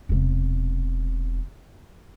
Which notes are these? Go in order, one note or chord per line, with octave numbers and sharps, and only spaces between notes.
E1 C3